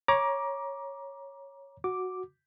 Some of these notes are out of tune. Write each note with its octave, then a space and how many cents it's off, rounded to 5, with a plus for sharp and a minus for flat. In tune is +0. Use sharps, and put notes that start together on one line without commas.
C#5 -5 A#5 +25 D6 +0
F#4 -5 D6 +0